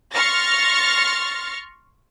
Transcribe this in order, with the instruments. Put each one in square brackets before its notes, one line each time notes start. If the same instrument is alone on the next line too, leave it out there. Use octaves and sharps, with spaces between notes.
[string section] C6 C#6 F6 A6 A#6